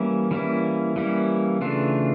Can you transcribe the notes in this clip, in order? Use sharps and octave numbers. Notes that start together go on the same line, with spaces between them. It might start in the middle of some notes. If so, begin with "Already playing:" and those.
Already playing: E3 G3 A#3 C#4 E4
E3 G3 A#3 C#4 E4
E3 G3 A#3 C#4 E4
C#3 E3 A3 D4 F4